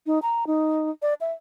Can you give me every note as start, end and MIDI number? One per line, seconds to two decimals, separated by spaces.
0.06 0.19 63
0.22 0.47 82
0.47 0.90 63
1.02 1.14 74
1.21 1.32 76